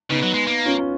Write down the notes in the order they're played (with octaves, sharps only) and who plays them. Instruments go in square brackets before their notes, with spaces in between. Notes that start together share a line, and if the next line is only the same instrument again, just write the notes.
[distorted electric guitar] C#3 [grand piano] B3 D#4
[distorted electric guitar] F#3
G#3
A#3
[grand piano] C#4 F4